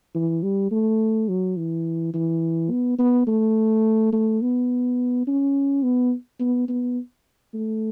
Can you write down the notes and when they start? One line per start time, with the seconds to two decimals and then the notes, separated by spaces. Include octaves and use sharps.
0.15 E3
0.43 G3
0.71 A3
1.28 F#3
1.57 E3
2.14 E3
2.71 B3
2.99 B3
3.27 A3
4.13 A3
4.42 B3
5.27 C#4
5.83 B3
6.40 B3
6.69 B3
7.54 A3